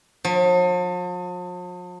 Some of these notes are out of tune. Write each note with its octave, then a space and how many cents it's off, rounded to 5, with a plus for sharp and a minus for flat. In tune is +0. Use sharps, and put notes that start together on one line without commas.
F3 +45